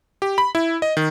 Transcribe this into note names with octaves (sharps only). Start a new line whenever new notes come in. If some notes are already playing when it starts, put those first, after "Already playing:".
G4
B5
E4
D#5
D#3